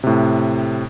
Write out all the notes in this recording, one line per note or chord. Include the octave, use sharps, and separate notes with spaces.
A2 C3